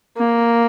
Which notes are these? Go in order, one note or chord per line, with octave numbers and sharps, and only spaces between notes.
A#3